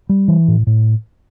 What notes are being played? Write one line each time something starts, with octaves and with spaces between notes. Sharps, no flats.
G3
E3
A2
A2